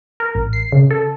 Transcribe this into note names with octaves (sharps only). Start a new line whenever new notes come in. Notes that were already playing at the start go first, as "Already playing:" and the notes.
A#4
A1
C7
C#3
A4